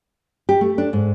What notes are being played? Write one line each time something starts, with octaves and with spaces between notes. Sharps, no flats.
G4
A3
D4
G#2